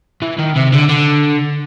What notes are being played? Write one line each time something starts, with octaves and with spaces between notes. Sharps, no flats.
E3
D#3
C3
D3
D3